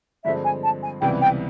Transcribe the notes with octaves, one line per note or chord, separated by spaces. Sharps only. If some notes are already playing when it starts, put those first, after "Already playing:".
G2 D3 F3 G#3 C4 E5
G#5
A5
G#5
C#2 C3 E3 G3 B3 G5
G5